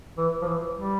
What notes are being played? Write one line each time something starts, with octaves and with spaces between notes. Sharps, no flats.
E3
F3
E3
G3